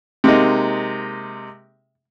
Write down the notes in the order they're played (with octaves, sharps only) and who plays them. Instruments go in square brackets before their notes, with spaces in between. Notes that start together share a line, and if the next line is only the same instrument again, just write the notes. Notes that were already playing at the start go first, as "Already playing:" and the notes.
[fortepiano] C3 G#3 A#3 D#4